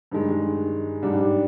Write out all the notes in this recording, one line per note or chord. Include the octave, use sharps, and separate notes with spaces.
G2 D#3 G#3
G#2 G3 D4